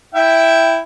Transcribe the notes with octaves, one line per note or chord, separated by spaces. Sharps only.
E4 E5 G5